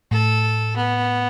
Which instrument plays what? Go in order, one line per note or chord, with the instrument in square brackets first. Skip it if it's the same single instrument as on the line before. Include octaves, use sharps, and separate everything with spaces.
[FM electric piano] A2 [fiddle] A4
[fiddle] B3